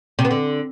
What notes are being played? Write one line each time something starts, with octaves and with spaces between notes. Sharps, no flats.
C3
B3
D3